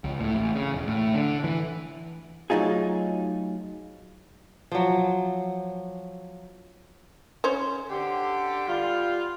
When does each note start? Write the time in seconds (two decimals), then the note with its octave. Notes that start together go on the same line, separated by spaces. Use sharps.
0.04 C#2
0.20 A2
0.35 A1
0.55 C#3
0.74 E1
0.87 A2
1.14 D3
1.44 E3
2.50 F#3 A3 D#4 F4 G#4
4.72 F3 F#3
7.44 C#4 C5
7.89 D3 G4
8.67 G3 F4